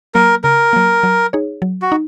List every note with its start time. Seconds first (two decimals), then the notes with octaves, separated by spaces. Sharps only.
0.15 F#3 A#3 A#4
0.44 C#3 A#4
0.73 F#3 A#3
1.03 F#3
1.33 D#4 G#4 C#5
1.62 F#3
1.82 F#4
1.92 D#4